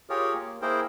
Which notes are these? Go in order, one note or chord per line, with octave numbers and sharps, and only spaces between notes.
F4 G4 G#4 A#4 C#5
A#3
A#3 E4 G#4 A#4 C5 G5